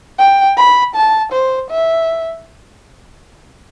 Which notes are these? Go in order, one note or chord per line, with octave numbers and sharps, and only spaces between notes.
G5
B5
A5
C5
E5